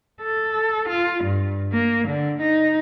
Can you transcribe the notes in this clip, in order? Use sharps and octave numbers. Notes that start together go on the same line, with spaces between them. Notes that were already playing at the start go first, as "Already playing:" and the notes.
A4
F4
G2
A#3
D3
D#4